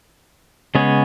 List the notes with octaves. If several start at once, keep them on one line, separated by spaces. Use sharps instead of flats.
C#3 G#3 B3 G#4 C#5